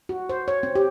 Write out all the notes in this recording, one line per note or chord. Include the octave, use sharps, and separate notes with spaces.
F#4
C5
C#5
C4
G4